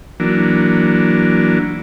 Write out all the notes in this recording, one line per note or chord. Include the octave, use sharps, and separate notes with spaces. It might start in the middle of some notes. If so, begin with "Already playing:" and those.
E3 F#3 A#3 D4